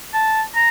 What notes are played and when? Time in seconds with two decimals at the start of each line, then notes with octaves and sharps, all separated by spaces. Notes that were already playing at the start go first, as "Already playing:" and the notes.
0.13 A5
0.55 A#5